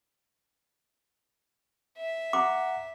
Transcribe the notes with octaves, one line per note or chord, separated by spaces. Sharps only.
E5
F#5 A#5 D6